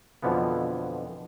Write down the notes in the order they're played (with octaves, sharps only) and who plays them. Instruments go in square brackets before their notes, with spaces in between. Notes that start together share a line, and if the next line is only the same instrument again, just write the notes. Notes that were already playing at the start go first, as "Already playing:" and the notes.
[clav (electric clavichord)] F2 B2 D3 E3 F3 B3